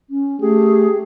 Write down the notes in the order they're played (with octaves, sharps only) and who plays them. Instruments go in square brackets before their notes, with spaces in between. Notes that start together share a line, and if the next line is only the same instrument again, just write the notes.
[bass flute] C#4
[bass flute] A3 [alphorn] G4 [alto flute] G#4